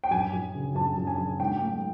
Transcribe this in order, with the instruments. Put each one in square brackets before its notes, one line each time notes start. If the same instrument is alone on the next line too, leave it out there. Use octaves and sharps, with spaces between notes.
[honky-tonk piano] G5
F#2 G#5
F#2
C#3
F#2 A5
F#2
G#5
F#2
G#2 G5
A3